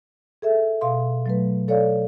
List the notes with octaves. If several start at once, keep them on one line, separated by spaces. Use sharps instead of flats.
G#4 A4 E5
B2 F5 C6
F#3 A3 B4
A4 C#5 D5 F5